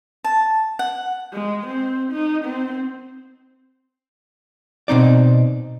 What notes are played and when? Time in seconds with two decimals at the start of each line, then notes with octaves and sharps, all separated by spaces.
0.24 A5
0.79 F#5
1.33 G#3
1.67 C4
2.12 D#4
2.45 C4
4.88 B2 C4 D#4 D5